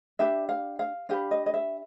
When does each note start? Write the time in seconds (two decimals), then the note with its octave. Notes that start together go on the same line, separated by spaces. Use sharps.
0.19 D4 G4 B4 E5
0.49 F5
0.79 F5
1.09 D4 G4 B4 F5
1.31 D#5
1.46 D#5
1.54 E5